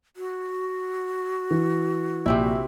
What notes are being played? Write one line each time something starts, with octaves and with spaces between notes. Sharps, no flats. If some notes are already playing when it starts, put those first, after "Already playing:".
F#4
E3
A#1 C3 C4 E4